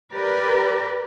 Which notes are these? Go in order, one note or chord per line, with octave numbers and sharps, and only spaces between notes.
G4 A#4 B4 D5